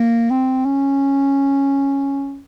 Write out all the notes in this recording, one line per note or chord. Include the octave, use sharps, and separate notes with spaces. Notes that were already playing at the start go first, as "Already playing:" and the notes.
Already playing: A#3
C4
C#4